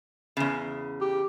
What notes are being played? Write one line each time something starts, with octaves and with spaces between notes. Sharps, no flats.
E2 C#3
G4